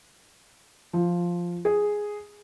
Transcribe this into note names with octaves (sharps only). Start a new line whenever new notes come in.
F3
G#4